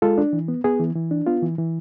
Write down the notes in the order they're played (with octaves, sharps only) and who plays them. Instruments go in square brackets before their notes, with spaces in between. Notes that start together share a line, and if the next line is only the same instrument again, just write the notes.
[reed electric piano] G#3 F4 A4
D4
E3
B3
B3 G#4
E3
E3
D4
B3 F4
E3
E3